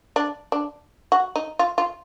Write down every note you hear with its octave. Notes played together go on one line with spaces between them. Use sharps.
D4
D4
F#4
D#4
F4
F4